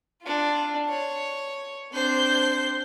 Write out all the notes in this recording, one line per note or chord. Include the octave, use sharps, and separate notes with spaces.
D4 F4
C#5
C4 D4 C5 G6